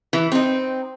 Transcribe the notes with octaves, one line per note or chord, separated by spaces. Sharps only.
E3
C4 D#4